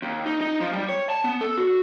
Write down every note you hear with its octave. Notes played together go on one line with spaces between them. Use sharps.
D#2
D#4
D#4
F3
G3
C#5
A5
B3
A4
F#4